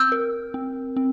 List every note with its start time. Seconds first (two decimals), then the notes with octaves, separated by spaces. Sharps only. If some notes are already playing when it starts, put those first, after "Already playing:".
Already playing: C4 E6 G6
0.12 A#4
0.54 C4
0.97 C4